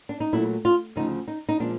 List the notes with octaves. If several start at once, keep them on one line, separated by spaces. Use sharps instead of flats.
D4
D#4
A#2 F#3 A3 E4
F4
D2 C#3 F3 D#4
D#4
D#4
A#2 F3 G#3 D4